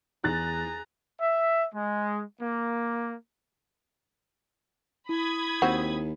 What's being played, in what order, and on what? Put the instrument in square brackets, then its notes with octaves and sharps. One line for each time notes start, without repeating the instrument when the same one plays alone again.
[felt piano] E2 [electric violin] G#4 A#5 [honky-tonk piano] F#6 A6
[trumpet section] E5
G#3
A#3
[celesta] E4 [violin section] B5 D#6 G#6
[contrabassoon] D#2 [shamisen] C4 F#4